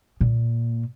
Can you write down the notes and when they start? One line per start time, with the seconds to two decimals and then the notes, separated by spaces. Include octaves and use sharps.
0.21 A#2